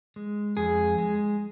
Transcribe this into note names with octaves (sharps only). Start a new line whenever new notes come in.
G#3
F2 G#4
G#3